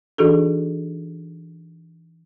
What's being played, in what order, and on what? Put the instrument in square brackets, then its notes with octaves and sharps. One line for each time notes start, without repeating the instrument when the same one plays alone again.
[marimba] E3 D4 D#4 F#4 G#4 A4